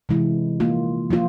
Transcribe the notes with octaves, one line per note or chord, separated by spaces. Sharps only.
C3 E3 G#3 E4
F3 A#3 F4
F3 A#3 F4